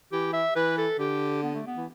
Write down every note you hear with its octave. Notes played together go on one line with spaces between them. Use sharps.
E3 G4
E5
E3 B4
A4
D3 G4
B3
A3
B3
E3